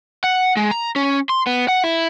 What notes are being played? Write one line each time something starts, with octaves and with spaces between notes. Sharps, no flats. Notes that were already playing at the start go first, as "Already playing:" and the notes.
F#5
G#3
A#5
C#4
C6
B3
F#5
E4